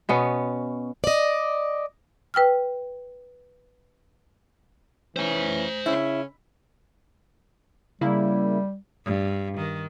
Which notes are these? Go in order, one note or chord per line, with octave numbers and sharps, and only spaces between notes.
B2 B3 C#4
D5 D#5
B4 G5 E6 F6
E3 C#4 C5 G#5
C#3 C#4 E4
C#3 G3 A#3 E4
G2
D#3